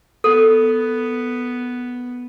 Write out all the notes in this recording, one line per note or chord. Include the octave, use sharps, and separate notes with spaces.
B3 A4